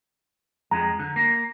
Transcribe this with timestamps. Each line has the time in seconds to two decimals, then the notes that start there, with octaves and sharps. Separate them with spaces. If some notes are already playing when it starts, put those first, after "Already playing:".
0.71 F2 G#3 A#5
0.99 D3
1.16 A#3